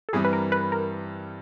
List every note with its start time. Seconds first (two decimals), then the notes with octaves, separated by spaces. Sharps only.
0.09 A4
0.13 G2 E3 G3 C4 G#4
0.25 B4
0.33 A#4
0.52 B4
0.72 A#4